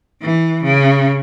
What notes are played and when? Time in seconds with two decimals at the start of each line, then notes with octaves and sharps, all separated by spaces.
0.22 E3
0.64 C#3